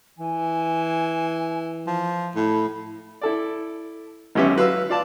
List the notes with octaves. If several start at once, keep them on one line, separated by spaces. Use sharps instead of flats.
E3 G#5
F3
A2 B5
E4 A4 D5
G#1 F#2 B3 C#4 G4 E5
F#3 B4 F5 B5 E6
F4 D5 A5